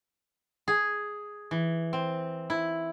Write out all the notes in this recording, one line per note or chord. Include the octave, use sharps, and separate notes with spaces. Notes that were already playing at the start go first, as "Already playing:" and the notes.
G#4
E3
C4
E4